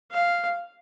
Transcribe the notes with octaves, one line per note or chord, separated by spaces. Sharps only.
F5